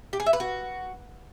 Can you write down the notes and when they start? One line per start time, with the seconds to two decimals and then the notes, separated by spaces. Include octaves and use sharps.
0.13 G4
0.20 G#4
0.26 E5
0.33 B4
0.40 F#4